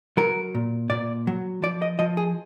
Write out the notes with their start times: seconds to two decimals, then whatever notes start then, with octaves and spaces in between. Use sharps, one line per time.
0.17 F#3 A#4
0.55 A#2
0.90 A#2 D5
1.27 F#3
1.62 F3 D5
1.82 D#5
1.99 F3 D#5
2.17 G#4